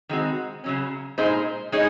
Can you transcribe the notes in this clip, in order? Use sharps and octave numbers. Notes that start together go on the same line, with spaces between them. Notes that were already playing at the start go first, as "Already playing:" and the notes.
D#3 G#3 C4 F#4
C#3 F#3 C#4
A#2 G#3 D#4 G#4 C5
G#3 D#4 G#4 C#5